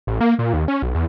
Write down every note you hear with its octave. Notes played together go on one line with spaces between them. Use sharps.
A1
A#3
A#2
D#2
C#4
B1
E2